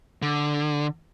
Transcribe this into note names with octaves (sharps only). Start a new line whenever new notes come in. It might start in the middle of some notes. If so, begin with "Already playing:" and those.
D3